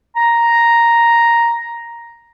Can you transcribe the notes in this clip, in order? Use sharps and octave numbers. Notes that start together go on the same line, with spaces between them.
A#5